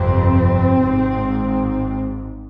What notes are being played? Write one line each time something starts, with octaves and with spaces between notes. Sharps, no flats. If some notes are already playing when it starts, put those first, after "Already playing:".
Already playing: G1 F2 C3 C4
G#1 G#2